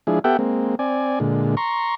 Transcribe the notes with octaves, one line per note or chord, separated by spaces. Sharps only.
F3 G#3 D4 E4 G#4
B3 G4 A4 E5 F#5 G5
G#3 A#3 C4
C4 D5 G#5
A#2 D3 G#3
A#5 C6 C#6